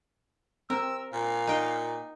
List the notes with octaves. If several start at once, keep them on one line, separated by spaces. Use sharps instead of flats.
C4 A#4 E6
A#2 F5
D#4 G5